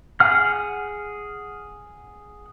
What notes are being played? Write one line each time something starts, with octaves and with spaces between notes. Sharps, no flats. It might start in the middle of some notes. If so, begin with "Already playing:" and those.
G#4 F#5 F6